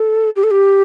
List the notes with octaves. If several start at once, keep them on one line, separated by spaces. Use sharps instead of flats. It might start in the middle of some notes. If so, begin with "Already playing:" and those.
Already playing: A4
G4
A4
G4